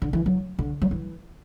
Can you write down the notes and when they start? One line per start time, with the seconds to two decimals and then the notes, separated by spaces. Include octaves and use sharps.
0.02 D3
0.13 E3
0.26 F#3
0.59 D3
0.82 F#3
0.91 E3